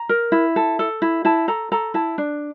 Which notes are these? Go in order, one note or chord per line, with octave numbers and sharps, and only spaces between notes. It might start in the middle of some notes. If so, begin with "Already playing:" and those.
Already playing: A#5
A#4
E4
A4
A4
E4
E4 A5
A4 A#5
A4 A#5
E4 A5
D4